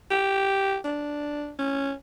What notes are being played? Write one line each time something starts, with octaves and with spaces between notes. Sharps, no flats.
G4
D4
C#4